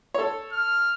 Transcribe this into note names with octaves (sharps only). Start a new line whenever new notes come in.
A4 C#5
F6